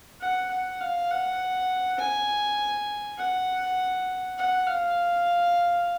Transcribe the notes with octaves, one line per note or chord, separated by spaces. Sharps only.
F#5
F#5
F5
F#5
G#5
F#5
F#5
F5